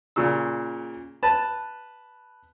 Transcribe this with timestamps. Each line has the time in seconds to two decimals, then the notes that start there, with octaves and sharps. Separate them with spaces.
0.16 A#2 C#3 E6
1.23 B4 A5